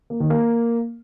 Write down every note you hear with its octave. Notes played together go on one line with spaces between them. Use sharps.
A#3
D#3
A#3